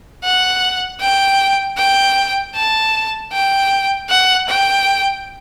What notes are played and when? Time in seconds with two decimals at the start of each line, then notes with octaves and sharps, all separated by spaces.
0.24 F#5
1.00 G5
1.77 G5
2.55 A5
3.32 G5
4.09 F#5
4.48 G5